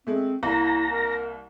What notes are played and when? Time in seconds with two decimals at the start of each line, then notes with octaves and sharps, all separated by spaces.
0.07 G#3 A3 C4
0.43 C2 A#3 E4 A#5
0.90 A#4